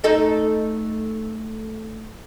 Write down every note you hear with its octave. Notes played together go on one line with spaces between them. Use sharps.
A3 D#4 A4